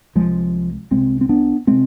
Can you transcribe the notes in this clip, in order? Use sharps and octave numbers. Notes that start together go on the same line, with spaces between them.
C2 C3 F3 G#3
C2 C3 G#3 C4
C4
B3 D4
C3 G#3 C4